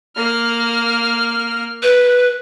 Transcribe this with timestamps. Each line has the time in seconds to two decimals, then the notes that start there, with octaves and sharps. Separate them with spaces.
0.15 A#3 F6
1.83 B4